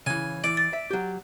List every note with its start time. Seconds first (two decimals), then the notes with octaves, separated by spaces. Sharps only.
0.06 C#3 E3 G#5
0.44 E3 D5
0.57 A6
0.73 E5
0.90 F#3 G4